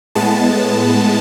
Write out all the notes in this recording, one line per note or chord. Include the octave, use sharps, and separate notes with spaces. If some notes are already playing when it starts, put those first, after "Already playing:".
A2 G#3 B3 A5